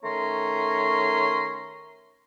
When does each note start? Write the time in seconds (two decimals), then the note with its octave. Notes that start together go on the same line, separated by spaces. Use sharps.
0.03 D#3 A3 C#4 C#5 A#5 C6